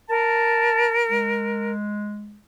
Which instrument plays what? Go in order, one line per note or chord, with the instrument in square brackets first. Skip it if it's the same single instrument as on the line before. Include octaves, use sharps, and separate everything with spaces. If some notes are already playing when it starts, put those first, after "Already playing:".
[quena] A#4 [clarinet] A5
[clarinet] G#3